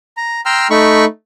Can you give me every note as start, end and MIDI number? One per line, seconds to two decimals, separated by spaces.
0.17 0.41 82
0.46 0.67 79
0.46 0.67 82
0.46 0.67 84
0.46 0.67 88
0.46 0.67 89
0.70 1.05 57
0.70 1.05 63
0.70 1.05 83
0.70 1.05 85